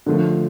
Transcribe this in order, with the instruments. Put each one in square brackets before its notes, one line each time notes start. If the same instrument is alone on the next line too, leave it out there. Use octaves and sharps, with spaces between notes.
[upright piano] D3 F3 A3